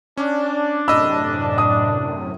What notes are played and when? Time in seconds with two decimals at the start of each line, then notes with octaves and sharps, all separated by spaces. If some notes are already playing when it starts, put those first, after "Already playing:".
0.17 C#4 D4
0.88 F#2 A2 C3 D#5 B5 E6
1.58 D#6